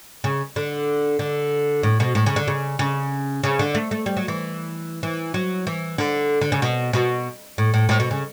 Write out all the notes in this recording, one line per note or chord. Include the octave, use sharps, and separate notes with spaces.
C#3
D3
D3
A2
B2
A2
C#3
D3
C#3
C#3
C#3
D3
A3
A3
G3
F#3
E3
E3
F#3
E3
D3
D3
C#3
B2
B2
A2
A2
A2
B2
C#3